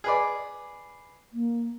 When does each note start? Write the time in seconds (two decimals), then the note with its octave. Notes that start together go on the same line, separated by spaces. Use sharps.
0.04 G#4 B4 D5
1.33 A#3